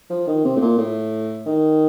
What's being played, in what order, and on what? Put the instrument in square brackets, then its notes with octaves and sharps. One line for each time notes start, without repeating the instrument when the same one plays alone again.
[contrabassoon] F3
D#3
C3
A2
A#2
A2
D#3